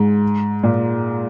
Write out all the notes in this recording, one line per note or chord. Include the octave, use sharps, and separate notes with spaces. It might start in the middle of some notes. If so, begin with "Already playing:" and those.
Already playing: G#2
A#2